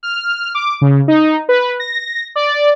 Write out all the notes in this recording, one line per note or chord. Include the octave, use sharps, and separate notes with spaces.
F6
D6
C#3
D#4
B4
A#6
D5